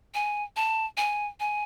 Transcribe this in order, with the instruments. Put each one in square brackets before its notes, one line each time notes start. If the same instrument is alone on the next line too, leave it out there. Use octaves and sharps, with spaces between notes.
[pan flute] G#5
A5
G#5
G#5